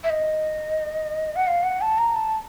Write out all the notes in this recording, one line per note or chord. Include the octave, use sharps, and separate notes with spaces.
E5
D#5
F#5
F5
F#5
A5
A#5
A5